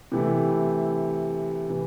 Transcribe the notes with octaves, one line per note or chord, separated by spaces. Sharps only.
C3 E3 A3 E4
C3 E3